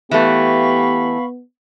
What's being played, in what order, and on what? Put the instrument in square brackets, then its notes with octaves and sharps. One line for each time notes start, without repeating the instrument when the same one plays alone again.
[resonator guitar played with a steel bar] E3 A3 [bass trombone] B3 [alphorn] G4 [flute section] F5 B5 C#6